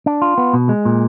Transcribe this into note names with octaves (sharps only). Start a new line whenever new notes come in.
D4
F4
B3
B2
G#3
A#2